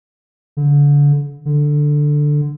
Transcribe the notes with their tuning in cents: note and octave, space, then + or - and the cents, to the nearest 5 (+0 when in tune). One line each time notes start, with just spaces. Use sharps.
D3 -30
D3 +5